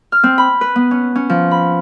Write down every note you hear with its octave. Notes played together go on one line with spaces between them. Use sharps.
F6
C4
B5
B4
B3
C#4
C#4
F3
B5